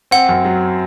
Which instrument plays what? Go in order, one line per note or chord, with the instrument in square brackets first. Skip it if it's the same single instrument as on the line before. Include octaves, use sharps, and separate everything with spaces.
[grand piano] C4 [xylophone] F#5
[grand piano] F#2
F#3